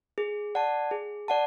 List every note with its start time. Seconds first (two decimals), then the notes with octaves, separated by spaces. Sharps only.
0.18 G#4
0.55 D5 F#5 A5
0.91 G#4
1.28 D5 F#5 A5